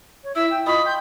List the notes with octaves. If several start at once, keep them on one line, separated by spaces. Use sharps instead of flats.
C#5
E4 E5 E6
G5
F4 D#5 B5 C#6 D#6
G5 C6 G6